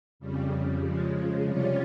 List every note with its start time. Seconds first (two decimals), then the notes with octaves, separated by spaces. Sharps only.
0.19 F2 C#3 G3
0.81 C#3 F3 G#3
1.43 C3 G3 C#4 F4